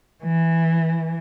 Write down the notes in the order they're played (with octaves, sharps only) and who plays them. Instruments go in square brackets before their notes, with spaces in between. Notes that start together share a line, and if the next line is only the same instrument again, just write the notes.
[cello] E3